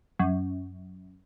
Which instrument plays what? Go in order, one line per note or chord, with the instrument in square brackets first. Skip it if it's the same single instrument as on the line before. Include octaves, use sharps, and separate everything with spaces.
[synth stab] F#2